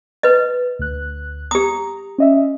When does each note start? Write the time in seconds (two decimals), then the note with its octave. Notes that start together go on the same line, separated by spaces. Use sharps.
0.23 B4 D#5
0.79 D2 F#6
1.51 G4 A#5 D#6
2.18 C#4 D#5 E5